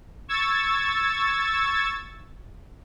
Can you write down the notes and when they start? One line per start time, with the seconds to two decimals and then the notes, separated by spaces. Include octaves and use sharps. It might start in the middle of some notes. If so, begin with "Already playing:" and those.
0.28 C#6 E6 G#6 A6